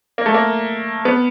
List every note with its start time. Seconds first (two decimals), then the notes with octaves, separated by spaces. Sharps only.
0.18 A#3
0.26 A3
0.34 A#3
1.05 B3